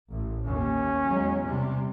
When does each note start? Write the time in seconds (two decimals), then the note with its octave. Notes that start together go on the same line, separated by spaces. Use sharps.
0.11 A1
0.45 D#2 C#4
1.06 E2 F#3 G#3
1.43 C3 G3